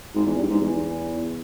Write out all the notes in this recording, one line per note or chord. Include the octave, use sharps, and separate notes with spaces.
G#2
E2
G2
G#2
E2